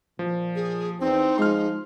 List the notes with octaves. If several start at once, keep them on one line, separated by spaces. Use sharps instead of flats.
A#2 F3
G#4
E2 C4 D#4
F3 G#3 C6 F6